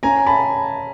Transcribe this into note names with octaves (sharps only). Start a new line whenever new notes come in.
C#4 G#5 A#5
A5 B5